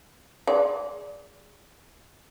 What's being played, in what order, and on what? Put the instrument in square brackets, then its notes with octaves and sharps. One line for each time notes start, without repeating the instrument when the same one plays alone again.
[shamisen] G#3 D5